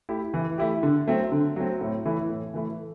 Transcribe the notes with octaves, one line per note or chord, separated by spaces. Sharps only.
A3 E4 G4
E3
A3 E4 G4
D3
F#3 A3 C4
D3
F#3 A3 C4
A2
E3 A3 E4
A2
E3 A3 E4